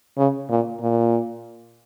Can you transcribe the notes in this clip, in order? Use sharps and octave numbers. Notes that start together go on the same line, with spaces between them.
C#3
A#2
A#2